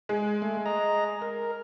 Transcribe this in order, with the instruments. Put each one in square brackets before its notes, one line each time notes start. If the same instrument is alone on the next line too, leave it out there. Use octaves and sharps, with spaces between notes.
[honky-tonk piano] G#3
[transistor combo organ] A3
D#5 A#5
A#4